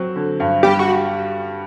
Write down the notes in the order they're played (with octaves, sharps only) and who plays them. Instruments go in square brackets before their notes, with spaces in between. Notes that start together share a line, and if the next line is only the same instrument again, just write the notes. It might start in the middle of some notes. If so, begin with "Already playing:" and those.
Already playing: [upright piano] F#3 C4
D3
G2
[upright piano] G3 [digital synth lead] G4
[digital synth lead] F#4